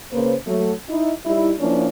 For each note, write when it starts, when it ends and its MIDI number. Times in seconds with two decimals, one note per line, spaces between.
0.13 0.35 49
0.13 0.35 58
0.13 0.35 71
0.13 0.35 72
0.47 0.73 54
0.47 0.73 57
0.89 1.12 63
0.89 1.12 64
1.26 1.53 55
1.26 1.53 63
1.26 1.53 64
1.59 1.87 53
1.59 1.87 58
1.59 1.87 61
1.59 1.87 62
1.59 1.87 64